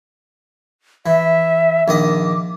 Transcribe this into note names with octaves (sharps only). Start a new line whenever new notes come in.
E3 E5
A#1 D#3 D#5 D6